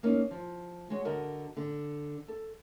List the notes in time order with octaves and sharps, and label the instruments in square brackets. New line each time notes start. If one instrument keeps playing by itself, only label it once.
[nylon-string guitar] A#3 C#4 D#4
F3
G#3 F#4 C#5
D3 F#4 A#4 D#5 A5
D3
A4